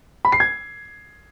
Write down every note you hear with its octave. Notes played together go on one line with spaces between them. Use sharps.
B5
C7
G#6